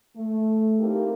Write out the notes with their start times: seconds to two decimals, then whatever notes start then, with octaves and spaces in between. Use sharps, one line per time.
0.15 A3
0.79 A#3 C4 D#4 E4 G4 A#4